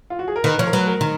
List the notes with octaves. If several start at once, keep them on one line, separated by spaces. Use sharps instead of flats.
F4
F#4
G#4
A#4
D#3 B4
F3 C#5
A#4
F#3 B4
A#4
D#3